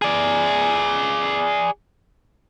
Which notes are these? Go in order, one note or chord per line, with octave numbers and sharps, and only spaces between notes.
G#4 D5